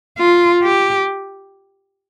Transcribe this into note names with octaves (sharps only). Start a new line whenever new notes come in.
F4
G4